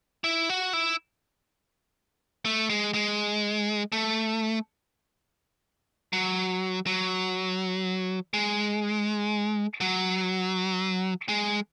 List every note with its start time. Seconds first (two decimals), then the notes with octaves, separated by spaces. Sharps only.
0.24 E4
0.49 F#4
0.73 E4
2.45 A3
2.70 G#3
2.94 G#3
3.92 A3
6.13 F#3
6.86 F#3
8.34 G#3
9.81 F#3
11.29 G#3